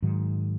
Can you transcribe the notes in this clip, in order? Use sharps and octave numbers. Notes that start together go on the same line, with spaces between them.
G#2 D#3 F#3